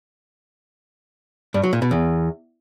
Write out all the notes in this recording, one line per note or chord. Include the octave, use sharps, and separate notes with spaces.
G2
F#3
A#2
B2
E2